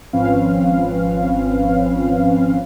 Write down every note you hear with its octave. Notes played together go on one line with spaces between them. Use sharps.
G#1 F3 C4 C#4 B4 F5